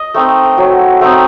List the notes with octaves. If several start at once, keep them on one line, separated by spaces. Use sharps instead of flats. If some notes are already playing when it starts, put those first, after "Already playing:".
Already playing: D#5
A3 C4 D#4
F#3
A3 C4 D#4